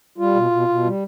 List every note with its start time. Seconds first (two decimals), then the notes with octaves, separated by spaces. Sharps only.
0.18 G3 F4
0.35 B2
0.51 B2
0.68 B2
0.84 G3